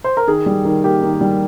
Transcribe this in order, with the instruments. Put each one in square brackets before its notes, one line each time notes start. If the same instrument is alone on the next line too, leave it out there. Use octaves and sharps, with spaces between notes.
[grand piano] C5
A#4
D#3 G#4
G3
D#3
A#3 G4
D#3
G3